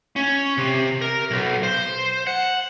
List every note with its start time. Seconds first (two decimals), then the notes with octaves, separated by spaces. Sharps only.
0.16 C#4
0.58 C3
1.01 A#4
1.31 B1
1.63 C5
2.27 F#5